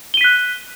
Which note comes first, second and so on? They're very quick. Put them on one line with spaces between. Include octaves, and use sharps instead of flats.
G7 D#7 B6 F#6